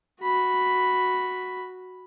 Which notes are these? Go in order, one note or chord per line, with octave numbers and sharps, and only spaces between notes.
F#4 B5